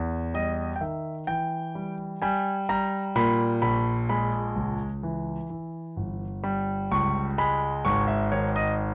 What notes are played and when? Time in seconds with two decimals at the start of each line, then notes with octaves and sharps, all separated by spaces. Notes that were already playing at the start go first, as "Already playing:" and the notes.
Already playing: E2
0.34 G3 D#5
0.76 G5
0.81 D#3 E5
1.27 E3 G5
1.75 G3
2.22 G3 G#5
2.69 G3 A#5
3.16 A#2 B5
3.62 A#1 B5
4.09 G#3 B5
4.56 C#2
5.03 E3
5.50 E3
5.97 G1
6.43 G3
6.91 C#2 C#6
7.38 G#3 B5
7.85 G#1 C#6
8.08 E5
8.32 D#3 C#5
8.56 D#5